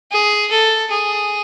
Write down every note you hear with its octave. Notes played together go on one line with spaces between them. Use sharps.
G#4
A4
G#4